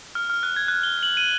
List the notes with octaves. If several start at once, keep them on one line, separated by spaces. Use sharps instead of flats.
F6
F6
F#6
G#6
F#6
G7
F#7
D#7